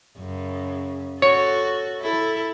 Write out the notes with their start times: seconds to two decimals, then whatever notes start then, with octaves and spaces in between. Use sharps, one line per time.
0.18 F#2 C#3
1.22 F#4 A4 C#5
2.01 E4 A4